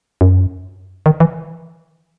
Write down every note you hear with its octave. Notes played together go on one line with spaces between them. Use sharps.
F#2
D#3
E3